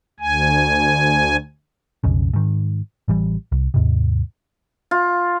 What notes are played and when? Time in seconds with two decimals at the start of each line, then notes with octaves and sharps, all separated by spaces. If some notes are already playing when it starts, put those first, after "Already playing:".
0.20 D2 G#5
2.04 B1 F2 C#3
2.33 G#2 D#3
3.08 A1 E3 G3
3.52 C2
3.74 D#2 G#2 C3
4.91 F4